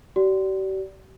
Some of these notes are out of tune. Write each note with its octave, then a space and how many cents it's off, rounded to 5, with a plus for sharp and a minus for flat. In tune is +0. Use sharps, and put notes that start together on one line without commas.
G4 -45 D5 -15